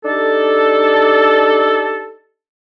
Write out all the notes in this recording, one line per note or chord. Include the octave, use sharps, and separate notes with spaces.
D4 D#4 G4 A4